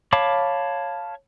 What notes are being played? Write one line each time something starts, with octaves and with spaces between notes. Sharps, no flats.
C#5 F5 A5 B5 D6